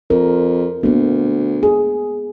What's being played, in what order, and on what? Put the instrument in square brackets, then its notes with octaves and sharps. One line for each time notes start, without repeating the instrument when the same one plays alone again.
[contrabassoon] F2 [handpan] A#4
[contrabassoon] D2 [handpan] A#3 B3
[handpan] G#4